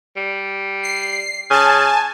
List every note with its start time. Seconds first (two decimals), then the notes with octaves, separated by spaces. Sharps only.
0.16 G3
0.83 C7
1.50 C#3 G#5 A5